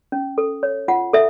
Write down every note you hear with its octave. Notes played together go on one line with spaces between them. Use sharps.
C#4
A4
C#5
F4 F#5
A4 E5